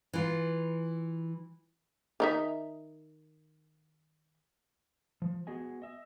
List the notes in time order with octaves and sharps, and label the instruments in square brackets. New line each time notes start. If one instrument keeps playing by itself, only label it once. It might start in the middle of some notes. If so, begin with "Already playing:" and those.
[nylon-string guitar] E3 F4
[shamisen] D#3 D#4 E5
[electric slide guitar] F3
B3 F#4 G#4 D#5 G#5
D#5 E5